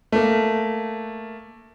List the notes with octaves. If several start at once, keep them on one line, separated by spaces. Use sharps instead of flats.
A3 A#3